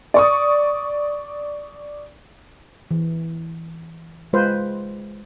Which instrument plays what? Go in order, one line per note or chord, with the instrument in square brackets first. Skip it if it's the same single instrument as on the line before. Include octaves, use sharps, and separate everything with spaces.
[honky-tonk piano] D5 C#6 D#6
[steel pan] E3
G#3 F4 B4 C5